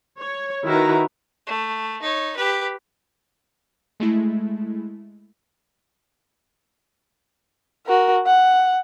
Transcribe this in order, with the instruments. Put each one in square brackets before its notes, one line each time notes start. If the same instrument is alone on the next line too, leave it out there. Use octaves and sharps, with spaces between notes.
[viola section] C#5
D#3 E4 F#4 A#4 B4 A#5
[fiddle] A3
D#4 C#5
G4 B4
[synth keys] G#3 A3 E4
[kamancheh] F#4 A#4
F#5